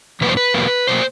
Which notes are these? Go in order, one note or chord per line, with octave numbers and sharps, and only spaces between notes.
E2 B2 F#3 A#3 B4
C5
B4
E2 B2 F#3 A#3
B2 F#3 A#3 C5